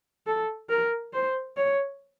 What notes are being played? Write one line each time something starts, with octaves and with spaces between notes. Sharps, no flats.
A4
A#4
C5
C#5